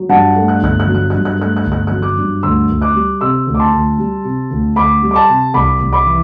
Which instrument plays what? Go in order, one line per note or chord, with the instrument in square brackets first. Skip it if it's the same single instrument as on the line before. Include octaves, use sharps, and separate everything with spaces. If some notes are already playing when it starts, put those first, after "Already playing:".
Already playing: [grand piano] F#3
G2 F#5 A5
A3
F#6
G1 F#6
F#6
F#3
F#6
F#6
G2
F#6
A3 F#6
F#6
G1
F#6
F#6
F#3
D6 F#6
G2
D2 C6 E6
D2
D6 F#6
G3
C3 C6 E6
D2
D6
A5 C6
D2
G3
C3
D2
D2 B5 D6
G3
D6
A5 C6
C3
C2 B5 D6
C2
B5 D6
E3